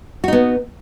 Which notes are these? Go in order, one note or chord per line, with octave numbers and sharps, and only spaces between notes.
B3 D#4 F#4